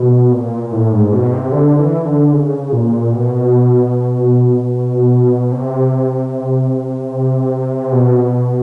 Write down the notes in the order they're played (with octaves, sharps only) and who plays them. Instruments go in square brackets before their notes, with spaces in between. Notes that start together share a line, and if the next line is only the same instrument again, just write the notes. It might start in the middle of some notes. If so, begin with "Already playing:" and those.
Already playing: [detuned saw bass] B2
A#2
A2
G#2
B2
C3
D3
E3
D3
C#3
A#2
B2
C3
B2